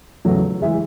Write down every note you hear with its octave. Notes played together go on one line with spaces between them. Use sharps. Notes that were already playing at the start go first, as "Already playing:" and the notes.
E2 C#3 F#3 A3
E3 G#3 E5